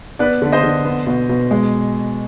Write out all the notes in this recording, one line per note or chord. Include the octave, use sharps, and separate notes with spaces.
B3 B4 D5
D3
C5 D#5
D3
B3
B2
B2
G#3